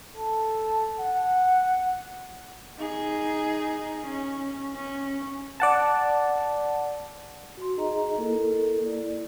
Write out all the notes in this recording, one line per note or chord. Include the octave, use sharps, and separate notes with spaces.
A4
F#5
D#4 G#4
C#4
C#4
D5 F#5 A5
F#4 C6
D#4 G#4 D#5 A#5
A#3 E4 A4 A#4
E4 D5